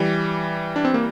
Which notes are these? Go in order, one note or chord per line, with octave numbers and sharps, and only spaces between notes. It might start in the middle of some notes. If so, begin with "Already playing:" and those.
Already playing: E3 G3
D4
C4
A#3